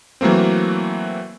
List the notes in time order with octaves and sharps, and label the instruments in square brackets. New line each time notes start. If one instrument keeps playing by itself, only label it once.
[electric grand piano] E3 F#3 A3 A#3 C4